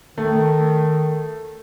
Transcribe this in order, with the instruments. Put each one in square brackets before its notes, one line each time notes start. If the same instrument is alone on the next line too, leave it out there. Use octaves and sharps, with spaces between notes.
[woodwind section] D#3 [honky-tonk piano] A3